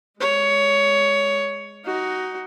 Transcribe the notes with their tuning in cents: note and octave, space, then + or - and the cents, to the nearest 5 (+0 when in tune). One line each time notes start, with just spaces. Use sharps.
G#3 +0 C#5 +15
D#4 +10 F#4 +15